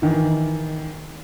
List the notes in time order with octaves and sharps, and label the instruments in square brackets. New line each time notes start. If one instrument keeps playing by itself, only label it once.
[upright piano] D#3 E3